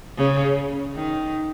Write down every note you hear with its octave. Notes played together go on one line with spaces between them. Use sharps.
C#3
D#3